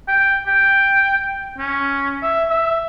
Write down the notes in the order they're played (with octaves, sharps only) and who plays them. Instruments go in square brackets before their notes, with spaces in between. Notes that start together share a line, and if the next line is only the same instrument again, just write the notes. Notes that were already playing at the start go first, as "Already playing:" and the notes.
[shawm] G5
G5
C#4
E5
E5